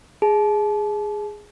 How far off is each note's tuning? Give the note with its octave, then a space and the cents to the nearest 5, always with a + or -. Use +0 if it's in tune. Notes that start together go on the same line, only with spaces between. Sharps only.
G#4 +0 A5 -35